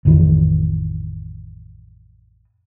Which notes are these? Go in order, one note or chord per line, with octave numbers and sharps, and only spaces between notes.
A1 F2 D#3 E3